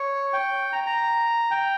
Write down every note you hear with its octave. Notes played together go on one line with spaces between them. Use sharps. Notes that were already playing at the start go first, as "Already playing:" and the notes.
Already playing: C#5
G5
A#5
A#5
G5